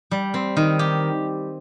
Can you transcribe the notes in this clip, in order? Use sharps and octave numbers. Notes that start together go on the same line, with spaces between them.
G3
C4
D#3
G4